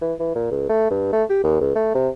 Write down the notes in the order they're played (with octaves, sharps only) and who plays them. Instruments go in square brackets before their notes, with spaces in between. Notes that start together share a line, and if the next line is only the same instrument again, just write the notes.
[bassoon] E3
E3
A#2
C#2
A3
G2
A3
G4
D#2
C#2
A3
C3